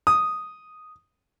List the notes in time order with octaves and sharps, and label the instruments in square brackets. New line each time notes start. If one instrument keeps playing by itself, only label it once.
[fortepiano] D#6